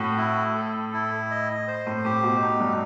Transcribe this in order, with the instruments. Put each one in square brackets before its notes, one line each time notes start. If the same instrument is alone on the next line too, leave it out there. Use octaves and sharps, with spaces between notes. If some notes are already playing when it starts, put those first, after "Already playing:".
Already playing: [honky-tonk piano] A2 [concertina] F#4
[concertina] E4
A4
E4
D#5
C5
[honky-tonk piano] A2
[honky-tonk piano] A2 [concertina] G4
[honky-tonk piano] B2
[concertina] D#4
[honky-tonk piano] G2